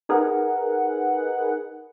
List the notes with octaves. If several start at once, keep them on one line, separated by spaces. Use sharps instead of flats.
D#4 G#4 A#4 B4 F#5